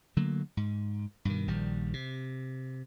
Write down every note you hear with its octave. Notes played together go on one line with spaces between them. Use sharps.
D3 F#3 A3 A#3
G#2
G2 B2 D#3
A#1 D#3 G3
C3